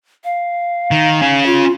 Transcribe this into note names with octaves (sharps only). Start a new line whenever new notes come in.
F5
D#3
C#4 G#4
F4